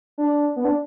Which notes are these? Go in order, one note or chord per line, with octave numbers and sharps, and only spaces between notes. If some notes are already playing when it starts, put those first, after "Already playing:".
D4
B3
D4